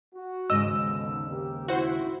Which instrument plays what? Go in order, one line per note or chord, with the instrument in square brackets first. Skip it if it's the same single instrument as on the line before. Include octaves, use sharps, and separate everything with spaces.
[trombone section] F#4
[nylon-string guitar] D#2 G#2 C#3 [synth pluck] D#5 [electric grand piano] E6
[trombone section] B2 D3 D#4
A#3 G4
[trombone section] E4 [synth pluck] F#4 C5